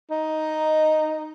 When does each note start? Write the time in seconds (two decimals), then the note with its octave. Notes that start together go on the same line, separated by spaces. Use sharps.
0.11 D#4